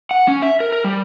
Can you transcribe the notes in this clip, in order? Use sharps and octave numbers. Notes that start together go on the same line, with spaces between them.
F#5
C#4
E5
A#4
A#4
G3